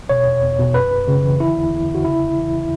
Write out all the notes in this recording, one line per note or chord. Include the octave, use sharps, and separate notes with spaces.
B2 C#5
E2
E2
B2
F#2 B4
G1
C#3
E3
D3 E4
E2
E2
D3
F#4
C#3 E4
E2
E3